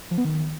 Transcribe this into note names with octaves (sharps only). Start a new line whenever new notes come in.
F3
B3
D#3